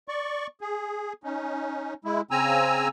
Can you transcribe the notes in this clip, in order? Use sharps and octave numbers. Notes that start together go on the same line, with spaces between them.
D5 C#6
G#4
C#4 D#4
G#3 E4
C#3 C4 G#5 A#5 E6